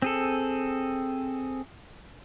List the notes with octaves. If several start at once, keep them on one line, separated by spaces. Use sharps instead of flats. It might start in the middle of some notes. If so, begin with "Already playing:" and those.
C4 G#4 A4